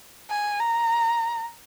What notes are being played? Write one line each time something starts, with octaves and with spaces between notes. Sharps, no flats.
G#5
A#5